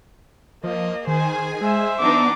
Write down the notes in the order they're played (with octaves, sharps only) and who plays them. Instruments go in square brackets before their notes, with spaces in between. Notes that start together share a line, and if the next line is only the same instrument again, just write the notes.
[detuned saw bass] F3 [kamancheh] A#3 D#5
[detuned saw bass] D#3 [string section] G#4 G#5 [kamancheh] C5
[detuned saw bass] G#3 [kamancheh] C5 E5
[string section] E3 D4 D#4 [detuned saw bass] B3 [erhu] D6